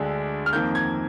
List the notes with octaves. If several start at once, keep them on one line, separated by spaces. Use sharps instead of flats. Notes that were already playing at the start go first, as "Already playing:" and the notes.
Already playing: D2 D3 G#3 D4
F6
F2 D#3 A#3 G6
G#6